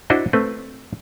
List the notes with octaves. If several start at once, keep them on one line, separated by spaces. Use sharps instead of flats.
D4 E4 F#4 C5 D#5
A3 C4 B4